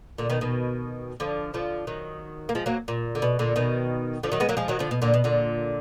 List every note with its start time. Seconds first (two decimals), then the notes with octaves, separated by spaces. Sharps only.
0.18 A#2 D3
0.30 B2 D#3
0.41 B2 D#3
1.20 D3 F3
1.54 D3 F3
1.87 D#3 F#3
2.49 A#3
2.55 F3 G#3
2.66 F#3 A#3
2.88 A#2
3.15 D3
3.22 B2
3.39 A#2 D3
3.56 B2 D#3
4.23 D3 F3
4.32 D#3 F#3
4.40 G#3 B3
4.49 F#3 A#3
4.57 F3 G#3
4.68 D#3 F#3
4.79 D3 F3
4.91 B2
5.02 A#2 D3
5.14 B2
5.24 A#2 D3